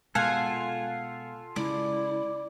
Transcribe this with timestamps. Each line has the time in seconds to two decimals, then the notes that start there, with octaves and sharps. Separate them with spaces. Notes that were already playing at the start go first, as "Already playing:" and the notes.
0.15 B2 G#3 F4 A4 F5 F#5 G#5
1.56 C#3 G#3 E4 D5